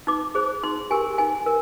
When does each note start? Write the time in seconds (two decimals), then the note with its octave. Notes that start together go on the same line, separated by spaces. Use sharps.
0.07 D#4 D6
0.35 G#4 C5
0.63 D#4 C6
0.91 G4 A#4 G#5
1.18 D#4 G#5
1.46 A#4